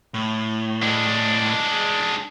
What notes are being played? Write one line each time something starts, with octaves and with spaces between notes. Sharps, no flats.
A2
G#3 D4